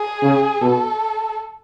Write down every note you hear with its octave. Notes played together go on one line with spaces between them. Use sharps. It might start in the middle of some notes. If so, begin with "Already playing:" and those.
Already playing: G#4
C#3
B2 A4